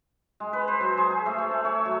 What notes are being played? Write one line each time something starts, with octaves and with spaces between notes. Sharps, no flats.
G#3
B4
C5
F#3
G#4
G#4
A3
C#5
E5
C#5
F#3